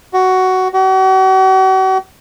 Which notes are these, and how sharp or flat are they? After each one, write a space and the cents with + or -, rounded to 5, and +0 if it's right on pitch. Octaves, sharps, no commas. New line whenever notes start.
F#4 +10
F#4 +40